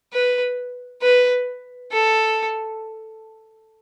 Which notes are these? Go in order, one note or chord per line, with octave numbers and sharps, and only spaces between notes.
B4
B4
A4